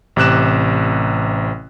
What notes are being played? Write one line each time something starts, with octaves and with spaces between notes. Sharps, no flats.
A1 C3 D6 F#6 E7